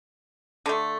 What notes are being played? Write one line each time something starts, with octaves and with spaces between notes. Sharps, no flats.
D3 A3